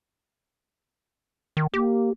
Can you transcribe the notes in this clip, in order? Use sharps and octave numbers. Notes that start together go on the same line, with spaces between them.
D#3
A#3 G4